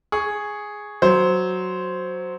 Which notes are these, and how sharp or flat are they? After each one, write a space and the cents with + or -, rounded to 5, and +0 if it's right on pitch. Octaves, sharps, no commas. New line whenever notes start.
G#4 +0 C#6 +0
F#3 +0 C5 -5